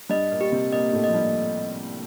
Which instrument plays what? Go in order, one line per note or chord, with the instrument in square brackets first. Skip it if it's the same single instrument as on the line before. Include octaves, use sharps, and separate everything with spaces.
[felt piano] G2 G3 [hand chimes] D#5
[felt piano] A#2 A#3
[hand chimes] G4
[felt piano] C3 C4
[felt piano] A#2 A#3 [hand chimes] D#5
[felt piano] A2 A3
[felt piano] F3 [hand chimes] D#5
[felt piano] G2 G3